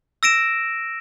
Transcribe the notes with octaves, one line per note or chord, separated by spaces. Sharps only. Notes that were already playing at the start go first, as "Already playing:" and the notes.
E6 A#6 D7 E7